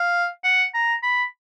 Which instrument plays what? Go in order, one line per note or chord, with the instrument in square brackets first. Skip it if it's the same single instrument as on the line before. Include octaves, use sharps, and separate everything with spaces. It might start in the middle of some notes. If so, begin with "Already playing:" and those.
Already playing: [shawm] F5
F#5
A#5
B5